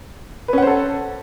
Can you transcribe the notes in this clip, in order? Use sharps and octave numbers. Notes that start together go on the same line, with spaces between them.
C#4 A4 B4 C5 F#5